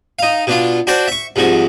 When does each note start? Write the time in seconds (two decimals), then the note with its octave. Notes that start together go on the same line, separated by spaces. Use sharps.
0.19 D#4 F5
0.47 B2 D4 F4
0.87 D4 F#4 C5 D5 G5 A5
1.08 E5 C#6
1.36 C2 G#2 F3 F#4